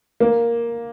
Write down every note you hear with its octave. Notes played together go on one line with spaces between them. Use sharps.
A#3